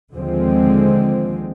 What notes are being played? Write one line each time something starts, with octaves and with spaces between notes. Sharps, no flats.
D#2 D3 F3 G#3 C4